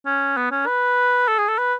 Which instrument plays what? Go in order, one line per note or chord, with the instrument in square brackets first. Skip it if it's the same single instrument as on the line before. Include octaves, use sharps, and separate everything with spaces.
[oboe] C#4
B3
C#4
B4
A4
G#4
A4
B4